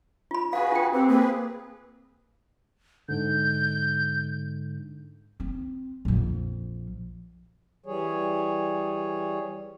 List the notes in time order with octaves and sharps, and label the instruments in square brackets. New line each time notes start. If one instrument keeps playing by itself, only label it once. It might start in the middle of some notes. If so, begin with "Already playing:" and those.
[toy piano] F4 B5
[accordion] F#4 G#4 B4 [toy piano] F5 [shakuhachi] G#5
[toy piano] F4 G5
[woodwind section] C4 [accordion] G4 [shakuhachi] B4
[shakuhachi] A#3 [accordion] G#4 B4
[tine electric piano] G#2 D3 [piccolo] G6
[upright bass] C4
A#1 F2
[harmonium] E3 G3 G#4 C#5